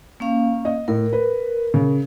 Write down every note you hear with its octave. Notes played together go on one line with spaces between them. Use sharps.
A#3 C#4 F5
D#5
A2 A#4
B4
C#3